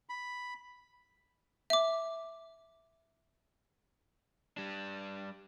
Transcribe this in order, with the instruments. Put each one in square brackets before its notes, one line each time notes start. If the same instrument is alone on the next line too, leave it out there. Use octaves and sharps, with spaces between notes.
[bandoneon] B5
[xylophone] E5 D6
[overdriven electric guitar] G3 D4